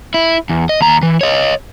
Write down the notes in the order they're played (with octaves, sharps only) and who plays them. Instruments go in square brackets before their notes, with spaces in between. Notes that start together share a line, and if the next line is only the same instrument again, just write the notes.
[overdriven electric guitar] E4
E2
D#5
D#2 A#5
E3
C#5 D#5